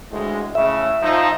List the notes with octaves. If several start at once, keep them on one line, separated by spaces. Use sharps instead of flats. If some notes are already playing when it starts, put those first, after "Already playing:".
D2 A2 G#3
A2 C#3 E5
F3 D#4